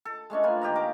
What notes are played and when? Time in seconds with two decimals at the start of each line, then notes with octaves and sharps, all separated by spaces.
0.05 A4
0.30 G#3 A3 C#4 D4
0.44 A#3 F4 B4 G#5
0.62 D#3 G4 D#5 A#5
0.76 A#3 A#4 D6